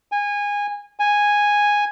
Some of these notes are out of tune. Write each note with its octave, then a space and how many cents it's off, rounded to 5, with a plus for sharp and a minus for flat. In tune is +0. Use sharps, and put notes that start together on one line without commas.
G#5 -20
G#5 -5